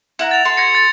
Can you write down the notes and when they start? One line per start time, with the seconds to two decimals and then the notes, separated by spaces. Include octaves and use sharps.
0.19 E4 F#5 A#5
0.31 A6 F7
0.45 F#4 A4 C6
0.57 G#6 A#6 C#7
0.75 A6